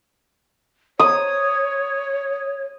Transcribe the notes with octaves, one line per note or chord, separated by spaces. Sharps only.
C#5 D#6